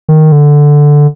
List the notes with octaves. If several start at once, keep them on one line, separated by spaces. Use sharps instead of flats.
D#3
D3